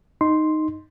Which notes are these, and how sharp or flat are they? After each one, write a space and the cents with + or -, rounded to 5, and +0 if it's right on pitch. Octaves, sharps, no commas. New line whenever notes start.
D#4 -5 C6 +0